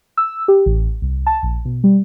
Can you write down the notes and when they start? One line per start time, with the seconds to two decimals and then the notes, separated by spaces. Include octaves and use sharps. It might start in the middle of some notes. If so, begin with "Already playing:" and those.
0.17 E6
0.48 G4
0.66 A1
1.02 C2
1.27 A5
1.43 A#1
1.65 B2
1.84 G3